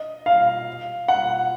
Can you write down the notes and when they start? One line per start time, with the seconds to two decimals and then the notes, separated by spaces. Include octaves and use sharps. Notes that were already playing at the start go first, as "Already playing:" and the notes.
Already playing: D#5
0.26 F5
1.08 F#5